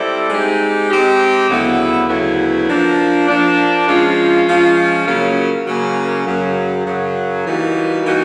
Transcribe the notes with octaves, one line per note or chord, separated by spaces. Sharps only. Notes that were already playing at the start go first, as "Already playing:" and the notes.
Already playing: G3 C4 E4 A4 D5
G#3 C4 D#4 G4
G#3 C4 D#4 G4
D2 C#3 F#3 B3 E4
D2 C#3 F#3 B3 E4
F3 A#3 D4
F3 A#3 D4
F3 G#3 C#4 F4
F3 G#3 C#4 F4
C#3 F#3 A#3 C#4
C#3 F#3 A#3 C#4
F#2 C#3 F#3
F#2 C#3 F#3
E3 G3 A#3 D#4 F#4
E3 G3 A#3 D#4 F#4